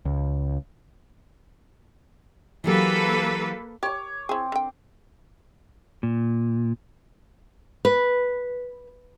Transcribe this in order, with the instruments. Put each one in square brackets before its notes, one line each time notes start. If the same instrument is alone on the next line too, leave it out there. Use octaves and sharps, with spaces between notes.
[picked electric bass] C#2
[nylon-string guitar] E3 F#3 G4 [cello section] A#3 A4 B4
[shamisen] G4 [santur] C#5 D6
[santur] C4 [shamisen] E4 G#4
[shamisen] D3 G5
[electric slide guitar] A#2
[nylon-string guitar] B4